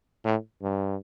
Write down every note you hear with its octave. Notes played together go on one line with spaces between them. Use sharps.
A2
G2